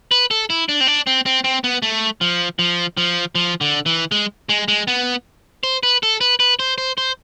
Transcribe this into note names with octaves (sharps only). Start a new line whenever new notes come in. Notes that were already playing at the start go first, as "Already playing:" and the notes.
B4
A4
E4
D4
C4
D4
C4
C4
C4
B3
A3
F3
F3
F3
F3
D3
E3
G#3
G#3
G#3
B3
C5
B4
A4
B4
B4
C5
C5
C5